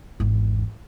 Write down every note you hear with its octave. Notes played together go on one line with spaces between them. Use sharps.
G#1 E2